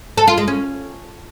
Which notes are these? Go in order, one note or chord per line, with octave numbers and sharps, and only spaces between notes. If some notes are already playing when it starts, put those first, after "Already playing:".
A4
F4
G#3
C#4